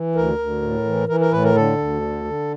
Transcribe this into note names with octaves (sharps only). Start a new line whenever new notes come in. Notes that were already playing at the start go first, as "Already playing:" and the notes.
Already playing: E3
D2 A#4
D2
A2
E3
E3 A#4
A#4
A2 B4
A#4
D3 A4
D2
D3
D3